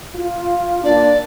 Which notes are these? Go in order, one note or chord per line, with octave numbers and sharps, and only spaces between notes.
F4
A#2 D4 D5